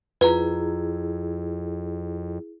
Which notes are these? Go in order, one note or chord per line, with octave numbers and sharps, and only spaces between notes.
F2 E4 F4 G#4 B4 A#5